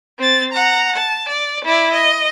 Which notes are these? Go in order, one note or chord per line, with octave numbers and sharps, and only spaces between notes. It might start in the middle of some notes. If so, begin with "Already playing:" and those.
C4 A6
F#5 A#5
A5
D5
E4 D5
D#5